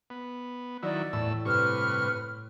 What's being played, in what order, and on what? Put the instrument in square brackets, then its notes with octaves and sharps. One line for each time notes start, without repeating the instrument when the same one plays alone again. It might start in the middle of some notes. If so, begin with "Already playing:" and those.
[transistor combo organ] B3
[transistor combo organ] D#3 F#3 E4 [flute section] D5
[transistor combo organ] E2 A3 E6 [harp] A2
[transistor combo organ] G2 C3 C#6 [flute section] B4 F6